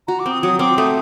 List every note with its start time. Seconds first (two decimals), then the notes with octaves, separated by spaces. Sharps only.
0.07 F#4 A#5
0.19 D6
0.26 C4
0.31 D#6
0.43 F#3 D#6
0.59 C4 D6
0.78 A3 D#6